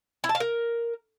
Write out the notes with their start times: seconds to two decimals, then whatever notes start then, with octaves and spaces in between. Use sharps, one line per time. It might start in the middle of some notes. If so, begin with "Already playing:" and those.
0.24 E4
0.29 A5
0.35 F5
0.40 A#4